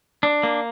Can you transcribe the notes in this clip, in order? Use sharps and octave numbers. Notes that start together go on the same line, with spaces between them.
D4
A#3